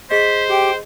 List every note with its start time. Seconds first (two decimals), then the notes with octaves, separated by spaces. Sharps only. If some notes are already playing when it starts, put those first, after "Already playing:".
0.11 G#4 C5 D#5 B6
0.49 G4 G5